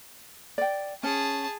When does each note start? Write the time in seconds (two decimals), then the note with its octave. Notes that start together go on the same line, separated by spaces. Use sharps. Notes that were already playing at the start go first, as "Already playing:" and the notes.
0.58 D5 G5
1.03 C#4 G#4 A5